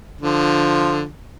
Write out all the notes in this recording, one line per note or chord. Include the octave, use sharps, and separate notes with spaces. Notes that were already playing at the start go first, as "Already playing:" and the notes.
D3 F3